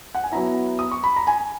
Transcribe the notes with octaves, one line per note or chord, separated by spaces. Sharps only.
F#5
G#5
F#3 B3 E4 A#5
D#6
C#6
B5
A#5
G#5